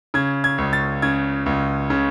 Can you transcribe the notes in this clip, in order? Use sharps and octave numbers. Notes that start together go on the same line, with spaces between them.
C#3 G#6
G#6
C#2
A6
C#3 G#6
C#2
C#3